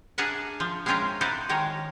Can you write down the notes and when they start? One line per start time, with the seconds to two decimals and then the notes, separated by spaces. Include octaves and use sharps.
0.18 D4 G#4 A#4 E5 F#5 A5
0.60 F3
0.86 G#3 C4 C#4 F4 A#4 E5
1.21 D#4 E4 F#4 A4 C5 D5
1.49 D#3 G#3 A#4 C#5